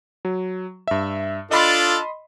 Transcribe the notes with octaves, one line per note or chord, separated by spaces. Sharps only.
F#3
G2 E5
D4 F4 A4 D#5 B5 C6